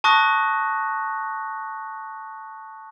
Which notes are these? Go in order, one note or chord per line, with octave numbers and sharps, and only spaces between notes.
A5 C#6 D#6 F#6 A#6